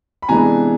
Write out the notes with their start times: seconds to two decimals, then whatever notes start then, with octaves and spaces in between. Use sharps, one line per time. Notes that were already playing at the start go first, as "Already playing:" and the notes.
0.22 B5
0.29 C3 E3 G#3 B3 D4 G#5 A#5